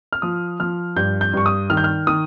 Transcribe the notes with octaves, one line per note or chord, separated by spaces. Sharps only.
F6
F3 D#6
F3 F6
G2 G6
G6
G2 C#6
D#6
D#3 F6
G6
F6
D#3 D#6